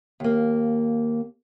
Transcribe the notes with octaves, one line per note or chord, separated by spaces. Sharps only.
D#2 A#3